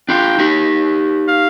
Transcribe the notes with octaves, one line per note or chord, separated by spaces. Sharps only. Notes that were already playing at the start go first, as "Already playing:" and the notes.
D4 F4 G5
D#4 G4
F5